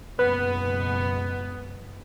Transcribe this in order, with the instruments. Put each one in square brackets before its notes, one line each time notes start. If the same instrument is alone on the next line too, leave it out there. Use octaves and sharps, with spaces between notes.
[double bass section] F#1 B2 G#3 [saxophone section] B3 [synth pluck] B4